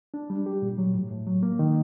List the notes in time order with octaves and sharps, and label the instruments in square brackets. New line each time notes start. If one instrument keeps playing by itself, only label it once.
[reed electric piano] D4
G3
G4
A#2
F#3
A2
A2
F#3
A#3
D#3